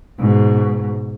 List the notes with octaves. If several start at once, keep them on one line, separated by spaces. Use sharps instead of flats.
G#2 B2